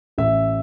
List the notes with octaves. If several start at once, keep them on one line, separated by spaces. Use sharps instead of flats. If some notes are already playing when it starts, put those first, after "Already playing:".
A1 E5